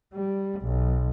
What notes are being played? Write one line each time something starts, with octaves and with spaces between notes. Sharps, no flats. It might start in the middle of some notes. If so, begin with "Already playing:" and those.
G3
B1